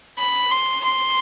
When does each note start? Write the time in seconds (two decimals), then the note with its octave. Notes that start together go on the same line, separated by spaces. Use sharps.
0.18 B5
0.52 C6
0.84 C6